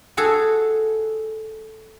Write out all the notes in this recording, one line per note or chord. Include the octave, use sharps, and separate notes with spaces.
F#4 G#4 A4